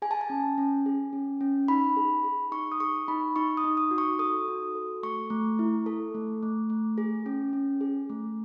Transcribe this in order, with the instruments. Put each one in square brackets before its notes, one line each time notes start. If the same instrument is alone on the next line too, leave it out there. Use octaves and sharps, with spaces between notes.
[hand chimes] G#4 G#5
A5
G#5
C#4
C#4
G#4
C#4
C#4
D#4 B5
G#4
G#4
D#4 C#6
D#6
G#4 C#6
D#4 B5
D#4 C#6
D#6
D#4
D#6
F#4
C#6
A4 D#6
F#4
A4
A3 C#6
A3
E4
A4
A3
A3
A3
G#4
C#4
C#4
G#4
A3